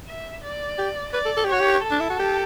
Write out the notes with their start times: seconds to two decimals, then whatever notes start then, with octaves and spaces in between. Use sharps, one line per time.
0.08 E5
0.44 D5
0.78 G4
1.13 B4 D5
1.25 A4
1.37 A4
1.45 G4
1.49 F#4 C#5
1.60 G4
1.84 A4
1.91 D4
2.00 E4
2.10 F#4
2.19 G4